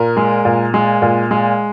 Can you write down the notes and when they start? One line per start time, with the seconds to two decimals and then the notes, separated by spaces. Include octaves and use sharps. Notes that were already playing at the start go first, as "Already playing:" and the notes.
Already playing: A#2 A#4
0.17 G#3
0.45 A#2
0.74 G#3
1.02 A#2
1.31 G#3